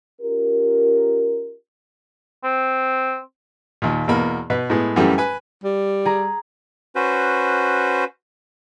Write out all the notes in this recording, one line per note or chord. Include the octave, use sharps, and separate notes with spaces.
C#4 F4 G4 A#4
C4
D#2 A#2
E2 B2 A#3 B5
B2 B4
A2 G#3 B3
F#2 C#3 E3 G3 A3
B4 G#5
G3
G#4 A#5
C#4 F#4 B4 C5